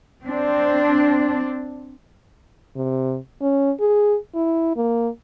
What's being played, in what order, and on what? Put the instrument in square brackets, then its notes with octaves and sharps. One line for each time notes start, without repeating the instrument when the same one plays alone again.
[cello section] C4 D4
[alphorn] C3
C#4
G#4
E4
A#3